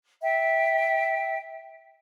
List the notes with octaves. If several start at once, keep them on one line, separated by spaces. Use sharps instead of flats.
E5 G5